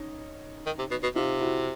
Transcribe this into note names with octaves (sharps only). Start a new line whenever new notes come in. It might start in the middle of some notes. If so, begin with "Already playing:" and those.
Already playing: C#4 D#4
D#3
C3
B2
B2
C3 D#4 F4
E4 F#4